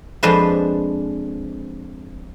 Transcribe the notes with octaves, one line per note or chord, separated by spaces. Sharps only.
F2 G#3 D4 B4 C5